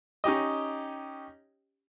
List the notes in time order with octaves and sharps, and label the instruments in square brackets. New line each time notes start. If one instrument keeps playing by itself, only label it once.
[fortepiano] C#4 D#4 G4 D#5